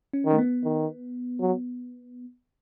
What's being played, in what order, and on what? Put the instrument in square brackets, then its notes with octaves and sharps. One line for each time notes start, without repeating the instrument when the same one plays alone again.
[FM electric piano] C#4
[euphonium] D#3
[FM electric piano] A3
B3
[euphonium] D#3
F#3